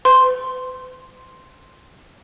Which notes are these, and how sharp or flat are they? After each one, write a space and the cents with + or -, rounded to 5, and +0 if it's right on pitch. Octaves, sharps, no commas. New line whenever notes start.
B4 +45 C6 +0